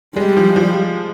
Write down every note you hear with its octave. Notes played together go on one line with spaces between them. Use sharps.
G3 G#3
F3
F3